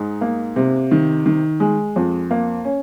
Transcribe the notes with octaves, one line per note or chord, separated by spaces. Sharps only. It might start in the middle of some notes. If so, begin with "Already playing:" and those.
Already playing: G#2 D#4
A#3
C3
D#3
D#3
G#3
F2
A#3
C#4